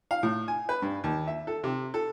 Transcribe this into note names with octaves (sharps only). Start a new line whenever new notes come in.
F5
A2
G#5
B4
G2
D#2
E5
A4
C3
A4